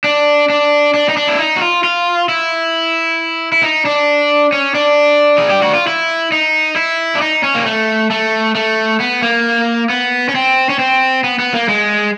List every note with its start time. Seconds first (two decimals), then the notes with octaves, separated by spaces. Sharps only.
0.04 D4
0.50 D4
0.94 D4
1.09 D#4
1.17 D4
1.28 E4
1.39 D#4
1.56 F#4
1.61 F4
1.84 F4
2.29 E4
3.52 E4
3.63 D#4
3.85 D4
4.52 C#4
4.75 D4
5.38 G#4
5.50 G4
5.62 F#4
5.74 F4
5.87 E4
6.32 D#4
6.76 E4
7.15 D4
7.21 D#4
7.44 C#4
7.55 A#3
7.66 A3
8.10 A3
8.55 A3
9.00 B3
9.22 A#3
9.90 B3
10.29 C#4
10.35 C4
10.69 C#4
10.79 C4
11.24 B3
11.39 B3
11.54 A#3
11.69 G#3